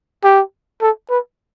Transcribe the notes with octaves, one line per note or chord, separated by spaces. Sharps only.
G4
A4
B4